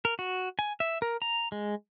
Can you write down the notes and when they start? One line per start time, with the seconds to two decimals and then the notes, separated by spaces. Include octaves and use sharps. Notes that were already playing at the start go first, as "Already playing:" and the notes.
0.05 A#4
0.19 F#4
0.59 G#5
0.80 E5
1.02 A#4
1.22 A#5
1.52 G#3